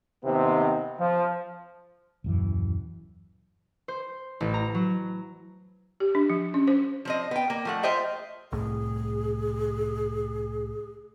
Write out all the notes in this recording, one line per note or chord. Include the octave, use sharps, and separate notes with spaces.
D#2 C3 B3 C4 D#4
F3
D#1 F#2 E3
C5
A1
A#5
F#3
G4
D4
F3
C#4
C5
F3 C4 D#5
B3 G5
A#3
F3 A3 F#5
F4 C5 D#5 E5 G5
C2 A2 G#4